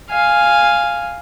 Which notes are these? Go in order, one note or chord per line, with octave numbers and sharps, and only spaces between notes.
F5 G#5